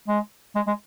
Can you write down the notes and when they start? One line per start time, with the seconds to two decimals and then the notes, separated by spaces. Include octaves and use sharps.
0.08 G#3
0.55 G#3
0.67 G#3